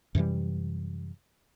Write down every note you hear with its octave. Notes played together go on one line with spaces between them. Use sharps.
F#2 C3 E3 G3